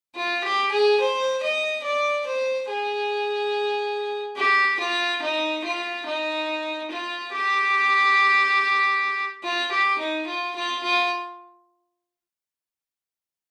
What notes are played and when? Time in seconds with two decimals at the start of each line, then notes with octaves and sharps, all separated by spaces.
0.16 F4
0.44 G4
0.72 G#4
1.00 C5
1.43 D#5
1.84 D5
2.27 C5
2.69 G#4
4.37 G4
4.80 F4
5.22 D#4
5.64 F4
6.06 D#4
6.91 F4
7.33 G4
9.43 F4
9.71 G4
9.99 D#4
10.27 F4
10.56 F4
10.83 F4